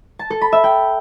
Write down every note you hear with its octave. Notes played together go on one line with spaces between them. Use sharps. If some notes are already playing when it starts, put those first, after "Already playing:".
A5
A4
B5
E5
G5